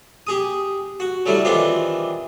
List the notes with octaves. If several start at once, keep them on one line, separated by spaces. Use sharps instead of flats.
G4 G#4 D#6
F#4
F#3 G3 A3 E4
D#3 E3 C4 D4 F4 G4